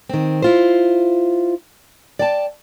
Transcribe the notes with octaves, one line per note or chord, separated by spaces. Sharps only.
D#3 C4
E4 F4 C5
D5 G5 A5